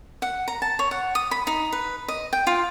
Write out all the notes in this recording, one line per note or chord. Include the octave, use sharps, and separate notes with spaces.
F#5
A#5
A5
C#5
F#5
D#6
B5
D#4
B4
D#5
G5
F4